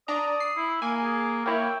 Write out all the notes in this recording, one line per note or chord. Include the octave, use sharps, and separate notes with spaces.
D4 D5 A#5 D#6
C7
E4
A#3 G#5
G#4
A#3 E4 C#5 G5